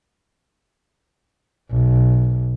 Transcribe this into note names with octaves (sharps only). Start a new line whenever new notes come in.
B1